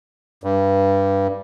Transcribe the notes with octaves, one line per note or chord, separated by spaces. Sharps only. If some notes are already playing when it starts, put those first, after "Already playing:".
G2